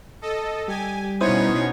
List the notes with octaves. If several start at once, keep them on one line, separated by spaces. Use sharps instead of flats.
A4 D#5
G3 G4 G#5
B2 B3 C#4 D#4 E4 C5 C#5 D#6